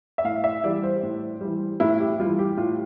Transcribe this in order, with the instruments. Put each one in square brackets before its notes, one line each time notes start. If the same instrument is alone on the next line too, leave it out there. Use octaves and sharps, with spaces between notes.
[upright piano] E5
A2 F5
E5
E3 G3 D5
C5
A2
E3 G3
A2 E4
G4
E3 G3 F4
G4
A2 F4